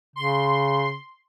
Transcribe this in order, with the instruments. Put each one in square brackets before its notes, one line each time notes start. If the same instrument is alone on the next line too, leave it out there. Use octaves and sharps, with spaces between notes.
[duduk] C#3 [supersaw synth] C6